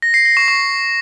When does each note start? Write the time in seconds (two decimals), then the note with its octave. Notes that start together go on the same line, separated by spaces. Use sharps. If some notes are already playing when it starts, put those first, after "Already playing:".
0.02 A#6
0.14 C7
0.25 A#6
0.37 C#6
0.48 C#6